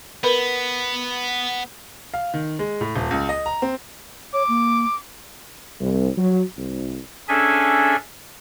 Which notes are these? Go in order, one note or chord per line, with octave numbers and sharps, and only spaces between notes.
B3 A#4 B4 B5
F5
D#3
G#3
A2
D#1
C#2
D#5
A#5
C4
C#5 D6
A#3
C2
F#3
C2
C#4 D4 G#4 A4 E5 G#5